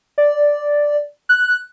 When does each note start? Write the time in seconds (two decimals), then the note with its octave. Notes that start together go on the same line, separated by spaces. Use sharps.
0.18 D5
1.29 F#6